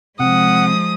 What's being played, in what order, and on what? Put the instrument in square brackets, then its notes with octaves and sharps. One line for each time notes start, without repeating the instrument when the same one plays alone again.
[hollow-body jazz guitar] C3 [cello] F3 G#3 [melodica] F#5 [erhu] D#6